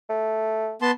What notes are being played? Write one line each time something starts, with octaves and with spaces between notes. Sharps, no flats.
A3
B3 A5 C6